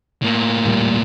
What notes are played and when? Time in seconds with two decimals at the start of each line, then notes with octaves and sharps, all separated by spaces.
0.22 A2 A#3
0.65 D#1 A#2 G3